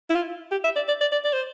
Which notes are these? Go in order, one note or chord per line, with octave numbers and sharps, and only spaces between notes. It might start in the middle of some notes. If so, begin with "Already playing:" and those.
E4
F4
G4
E5
D5
D5
D5
D5
D5
C5